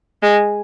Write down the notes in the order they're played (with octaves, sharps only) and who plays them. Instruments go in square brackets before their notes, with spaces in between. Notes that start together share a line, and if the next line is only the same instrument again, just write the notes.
[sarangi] G#3